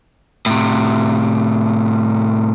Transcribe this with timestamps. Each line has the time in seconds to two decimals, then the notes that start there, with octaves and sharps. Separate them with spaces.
0.46 A2 C3